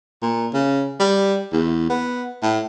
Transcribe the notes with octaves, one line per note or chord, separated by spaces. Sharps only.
A#2
C#3
G3
E2
B3
A2